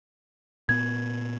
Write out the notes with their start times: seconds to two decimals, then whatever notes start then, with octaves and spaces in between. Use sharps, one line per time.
0.69 A#2 B3 G#6